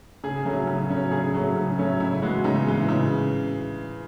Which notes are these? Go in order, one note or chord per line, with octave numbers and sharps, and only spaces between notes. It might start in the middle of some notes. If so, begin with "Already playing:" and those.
C#3 G#4
F#3 A3 C#4
C#3
F#3 A3 C#4
C#3 G#4
F#3 A3 C#4
C#3
F#3 A3 C#4
C#3 E4
E3 G#3 F#4
C#3 D#4
E3 G#3
C#3